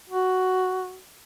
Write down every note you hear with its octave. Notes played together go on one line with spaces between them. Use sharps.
F#4